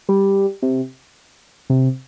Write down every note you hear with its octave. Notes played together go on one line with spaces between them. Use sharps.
G3
C3
C3